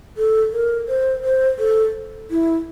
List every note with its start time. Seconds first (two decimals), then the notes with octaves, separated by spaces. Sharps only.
0.17 A4
0.52 A#4
0.88 C5
1.24 C5
1.59 A4
2.30 E4